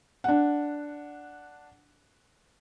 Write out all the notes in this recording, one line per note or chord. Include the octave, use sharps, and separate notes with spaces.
D4 F#5